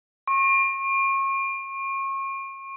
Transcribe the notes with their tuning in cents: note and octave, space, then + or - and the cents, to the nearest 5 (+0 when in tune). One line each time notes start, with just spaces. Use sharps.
C#6 -35